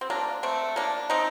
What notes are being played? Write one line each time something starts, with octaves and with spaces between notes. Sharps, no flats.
C4
A#3 D4
A3 C4
A#3 D4
C4 D#4